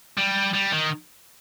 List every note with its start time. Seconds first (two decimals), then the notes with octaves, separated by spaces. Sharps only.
0.17 G3
0.53 G3
0.72 D#3